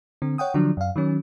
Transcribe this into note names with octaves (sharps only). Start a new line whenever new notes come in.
D3 C4
C#5 F#5 G5 D#6
D3 F3 F#3 D4
F#2 F5
D#3 F#3 C#4